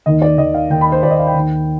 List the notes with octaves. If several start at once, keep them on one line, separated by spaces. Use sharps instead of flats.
D#2 D#3 D#5
D5
D#2 D#3 D#5
F5
D#2 D#3 G5
B5
C5
D#2 D#3 D5
D#5
F5
G5
D#2 D#3